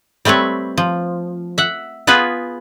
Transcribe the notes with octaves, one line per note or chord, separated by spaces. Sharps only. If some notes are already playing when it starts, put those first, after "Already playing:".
G3 A3 C4 B4 C#5
F3
E5 F#5
B3 F4 G#4 B4 F#5